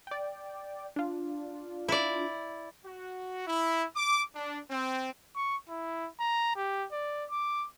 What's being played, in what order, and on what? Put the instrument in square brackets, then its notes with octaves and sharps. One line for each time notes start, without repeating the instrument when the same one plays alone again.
[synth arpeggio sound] D5 G5
D4 F4
[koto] E4 D5
[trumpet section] F#4
E4
D6
D4
C4
[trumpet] C#6
E4
A#5
G4
D5
D6